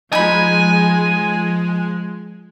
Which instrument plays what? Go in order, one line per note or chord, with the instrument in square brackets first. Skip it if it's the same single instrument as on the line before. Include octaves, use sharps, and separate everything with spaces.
[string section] F3 G#3 [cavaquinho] D#4 B5 [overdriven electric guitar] G#5